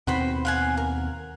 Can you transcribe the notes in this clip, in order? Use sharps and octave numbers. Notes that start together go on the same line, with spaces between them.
D#2 B2 C4 F#4 C5 B5
F5 F#5 G#5
A#4